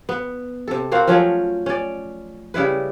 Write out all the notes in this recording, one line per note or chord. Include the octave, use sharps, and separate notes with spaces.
B3
C3 A4
A#3 C4 F#4 F5
F3 F#3 A3 C#4
C#4 D5
C#3 G3 E4 B4